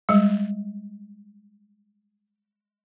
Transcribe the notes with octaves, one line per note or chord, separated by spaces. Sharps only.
G3 G#3